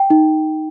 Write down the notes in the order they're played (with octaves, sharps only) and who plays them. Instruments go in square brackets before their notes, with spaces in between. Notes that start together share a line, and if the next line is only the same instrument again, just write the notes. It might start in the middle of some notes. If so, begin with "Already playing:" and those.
Already playing: [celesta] G5
D#4